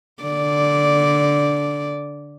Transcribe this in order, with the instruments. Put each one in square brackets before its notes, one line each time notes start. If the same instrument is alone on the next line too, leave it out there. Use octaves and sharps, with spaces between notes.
[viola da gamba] D3 D5